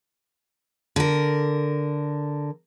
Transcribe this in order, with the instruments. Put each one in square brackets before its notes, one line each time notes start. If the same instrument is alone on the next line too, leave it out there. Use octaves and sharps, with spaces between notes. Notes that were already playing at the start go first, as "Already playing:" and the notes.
[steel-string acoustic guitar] D3 A#4